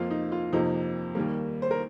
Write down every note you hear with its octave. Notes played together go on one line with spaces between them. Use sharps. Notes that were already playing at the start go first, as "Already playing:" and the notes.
Already playing: F2 F3 A#3 F4
D#4
F4
F2 C3 F3 A#3 D#4
D#2 D#3 G3 A#3
C5
A#4